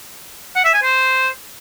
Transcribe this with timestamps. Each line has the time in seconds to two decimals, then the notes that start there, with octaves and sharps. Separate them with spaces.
0.56 F#5
0.65 E5
0.74 G#5
0.83 C5